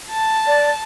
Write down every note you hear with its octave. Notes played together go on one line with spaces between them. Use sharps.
A5
D5